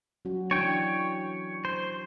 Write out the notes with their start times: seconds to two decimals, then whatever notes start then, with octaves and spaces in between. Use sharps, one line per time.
0.25 F#3 C#4 F#4
0.51 E3 D4 C#5 G5
1.65 C5